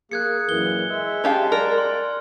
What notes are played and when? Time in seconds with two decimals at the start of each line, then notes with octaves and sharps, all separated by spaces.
0.11 A#3 G#4 F#6 G#6 C#7
0.49 F#2 A#2 E3 G7
0.89 G#3 E5
1.24 C#4 G4 F5 A5
1.52 A#4 D5 F6
1.78 C6